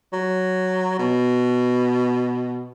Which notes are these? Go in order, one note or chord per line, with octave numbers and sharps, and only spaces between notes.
F#3
B2